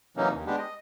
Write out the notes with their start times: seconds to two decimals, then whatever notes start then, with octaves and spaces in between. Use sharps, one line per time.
0.17 C3 E3 F#3 A#3 C#4 D#4
0.33 D#2
0.46 G#3 B3 D4 G4
0.58 D#5